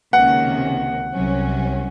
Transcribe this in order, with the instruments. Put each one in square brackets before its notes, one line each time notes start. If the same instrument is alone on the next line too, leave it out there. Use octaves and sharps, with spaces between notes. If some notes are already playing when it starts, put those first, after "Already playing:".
[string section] C#2 C3 D#3 A#3 C#4 [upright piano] F#5
[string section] C2 C3 F#3 C#4